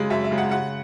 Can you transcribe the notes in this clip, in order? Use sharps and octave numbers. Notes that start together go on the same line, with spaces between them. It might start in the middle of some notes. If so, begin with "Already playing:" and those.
Already playing: F#2 C#3 G#3
F#2 E5
E5
C#3 G#3
F#5
C#3 F#5